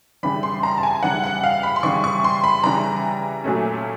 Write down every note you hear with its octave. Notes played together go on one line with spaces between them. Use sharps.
C#3 E3 G3 B5
C6
A#5
A5
G#5
C#3 E3 G3 F#5
F#5
F5
B5
C6
C#3 E3 G3 C#6
C#6
C6
B5
C#3 E3 G3 A#5
A#2 F#3 A3 C#4